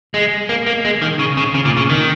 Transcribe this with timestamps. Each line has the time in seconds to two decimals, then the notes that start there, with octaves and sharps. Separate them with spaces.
0.14 G#3
0.49 A#3
0.66 A#3
0.85 G#3
1.02 D#3
1.19 C#3
1.37 C#3
1.54 C#3
1.65 A#2
1.77 C#3
1.90 D#3